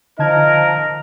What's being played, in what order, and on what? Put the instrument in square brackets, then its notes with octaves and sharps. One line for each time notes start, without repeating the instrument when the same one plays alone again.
[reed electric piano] D3 A5 G#6 [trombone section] F3 D#4 [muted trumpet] A#4